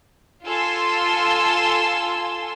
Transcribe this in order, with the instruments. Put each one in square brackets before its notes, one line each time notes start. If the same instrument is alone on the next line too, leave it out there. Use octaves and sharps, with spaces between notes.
[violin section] F4 A4 G#5 C6 E6